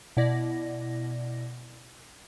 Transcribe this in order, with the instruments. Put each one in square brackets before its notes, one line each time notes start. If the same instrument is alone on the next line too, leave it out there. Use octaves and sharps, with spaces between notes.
[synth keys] B2 E4 D5 A#6